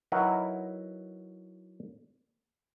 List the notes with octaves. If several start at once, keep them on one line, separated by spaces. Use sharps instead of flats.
F#3 D#4 E4 F#4 A#4 B4